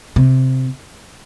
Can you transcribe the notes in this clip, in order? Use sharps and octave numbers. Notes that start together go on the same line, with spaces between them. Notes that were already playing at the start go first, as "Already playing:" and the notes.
C3